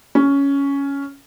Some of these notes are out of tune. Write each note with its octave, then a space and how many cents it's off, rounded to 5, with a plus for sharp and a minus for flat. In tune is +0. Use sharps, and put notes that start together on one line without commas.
C#4 +10